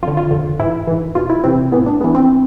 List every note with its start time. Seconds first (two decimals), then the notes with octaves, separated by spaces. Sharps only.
0.02 F2 D3 F4
0.17 F4
0.31 F2 D3
0.59 G#2 E3 E4
0.87 G#2 E3
1.15 E2 B2 F4
1.30 E4
1.44 E2 C3 E3 C4
1.72 A2 E3 B3
1.86 D4
2.01 G#2 E3 B3
2.15 C4